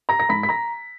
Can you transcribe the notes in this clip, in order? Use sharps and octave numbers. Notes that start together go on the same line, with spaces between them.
A#5 A#6
A#6
G#2 B5 B6
B6
A#5 A#6